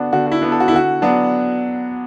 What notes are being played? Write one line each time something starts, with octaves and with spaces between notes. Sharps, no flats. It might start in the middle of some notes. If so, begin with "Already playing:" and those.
Already playing: D3 B3 D4 F#4
D3 F#4
F#4
E4
B3 D4
A4
F#4
E4
D3 F#4
F#3 B3 D4